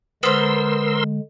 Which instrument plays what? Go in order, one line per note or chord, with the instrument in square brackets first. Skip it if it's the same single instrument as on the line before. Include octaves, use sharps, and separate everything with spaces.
[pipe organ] D3 G#3 [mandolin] B3 C5 [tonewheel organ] A#4 C6 E6